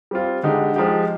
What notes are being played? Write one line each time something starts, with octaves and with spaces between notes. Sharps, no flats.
G3 C4 F4
D3 G#3 D#4 G4
F3 G#3 D#4 G4